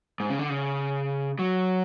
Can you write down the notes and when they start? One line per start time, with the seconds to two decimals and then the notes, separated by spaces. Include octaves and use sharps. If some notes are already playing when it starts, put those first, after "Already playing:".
0.20 G#2
0.29 C#3
0.39 D3
0.50 C#3
1.39 F#3